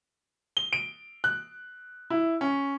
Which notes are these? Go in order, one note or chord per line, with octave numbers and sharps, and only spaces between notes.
G7
D7
F#6
E4
C#4